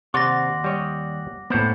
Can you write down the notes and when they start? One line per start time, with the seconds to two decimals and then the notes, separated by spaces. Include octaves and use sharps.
0.14 D#2 C3 D5 F#5 C6 D6 A#6
0.64 G3 C#5 D#5
1.50 A2 A#3 B3 C5 C#5